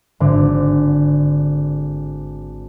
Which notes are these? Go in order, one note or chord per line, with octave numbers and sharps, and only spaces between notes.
G#1 D3